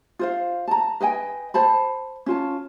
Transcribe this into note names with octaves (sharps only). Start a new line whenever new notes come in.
F4 C5 F5
A5 A#5
B4 D#5 G5 G#5
C5 A5 B5
C#4 F4 A5